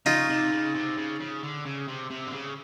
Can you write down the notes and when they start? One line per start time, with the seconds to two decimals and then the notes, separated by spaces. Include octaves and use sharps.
0.06 C#3 D#4 F4
0.29 C3
0.52 C#3
0.74 C3
0.97 C#3
1.20 C#3
1.43 D3
1.65 C#3
1.88 C3
2.11 C3
2.27 D3
2.34 C#3